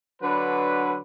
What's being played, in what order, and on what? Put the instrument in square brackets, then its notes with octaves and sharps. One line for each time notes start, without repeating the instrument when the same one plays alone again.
[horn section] D3 F#3 D4 B4